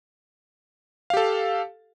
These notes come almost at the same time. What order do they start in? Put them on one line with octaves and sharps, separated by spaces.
F5 G4 A4